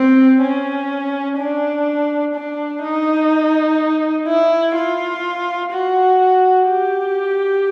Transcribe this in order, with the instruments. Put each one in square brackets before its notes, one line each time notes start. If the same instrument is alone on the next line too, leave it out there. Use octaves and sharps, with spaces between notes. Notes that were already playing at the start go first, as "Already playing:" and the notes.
Already playing: [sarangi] C4
C#4
D4
D4
D#4
E4
F4
F#4
G4